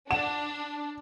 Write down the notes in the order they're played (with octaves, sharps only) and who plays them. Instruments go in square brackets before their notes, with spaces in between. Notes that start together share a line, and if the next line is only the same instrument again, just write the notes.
[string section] D4 [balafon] F#5 [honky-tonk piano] E7